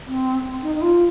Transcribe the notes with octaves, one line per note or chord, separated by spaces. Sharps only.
C4
D#4
D#4
F4